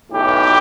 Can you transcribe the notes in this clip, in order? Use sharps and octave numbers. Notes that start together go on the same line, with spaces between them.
B1 A2 E3 G4